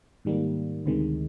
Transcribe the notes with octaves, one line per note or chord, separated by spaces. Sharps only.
G#2 D#3 G3 A#3
D2 C3 D#3 G#3